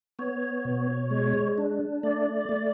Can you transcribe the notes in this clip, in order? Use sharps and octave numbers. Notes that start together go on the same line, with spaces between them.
B3 C#5
B2
G#3
D4
A3 D5
A3